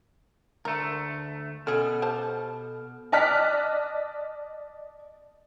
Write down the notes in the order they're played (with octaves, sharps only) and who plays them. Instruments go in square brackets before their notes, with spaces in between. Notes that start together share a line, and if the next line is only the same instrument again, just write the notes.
[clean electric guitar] D2 A3 [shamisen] A#4
[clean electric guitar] B2 [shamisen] C#4 G#4 [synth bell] A4 F6
[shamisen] G4 C5 A5
[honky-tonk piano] D5 D#5 A5 F6 F#6 B6